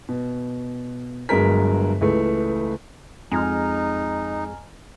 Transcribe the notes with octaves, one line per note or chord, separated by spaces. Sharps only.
B2
G1 G2 F#3 G#3 A#4 B6
C#2 E3 A3
F2 G#3 D#4 G#5 A#5 F6